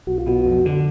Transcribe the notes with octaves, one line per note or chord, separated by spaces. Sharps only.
B1 F#4
F4
B2 F#4
F2
D3